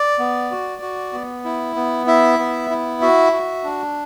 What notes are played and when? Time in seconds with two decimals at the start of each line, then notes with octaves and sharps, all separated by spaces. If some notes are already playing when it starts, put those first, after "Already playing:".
Already playing: D5
0.19 B3
0.51 F#4
0.82 F#4
1.13 B3
1.45 E4
1.76 B3
2.07 E4 E5
2.39 B3
2.70 E4
3.02 F#4 E5
3.33 F#4
3.64 D4